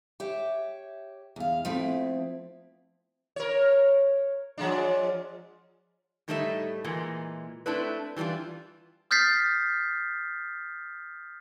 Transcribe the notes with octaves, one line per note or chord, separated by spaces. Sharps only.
G4 C#5 E5
E2 F5
F3 A3 C4 E4
A#4 C#5
F3 G#3 D4
A2 G3 A3 D#4 G#4 E5
A#2 E3 G#3
A3 C4 D4 E4 B4
E3 G3 A3 D4 F4
D#6 F6 G6 A6 B6 C7